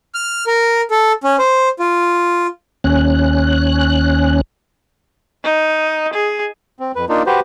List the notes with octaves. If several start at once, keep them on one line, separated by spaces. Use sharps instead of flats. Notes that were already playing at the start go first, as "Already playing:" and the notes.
F6
A#4
A4
C#4
C5
F4
D#2 C#4 F#6
D#4
G#4
C4
F2 B4
A#3 D4 D#4 F4
F#4 G4 B4 C5